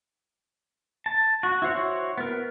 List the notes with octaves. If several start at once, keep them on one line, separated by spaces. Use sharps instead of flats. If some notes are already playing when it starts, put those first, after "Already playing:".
A5
F#4
E4 F#4 C5 C#5
B3 A#4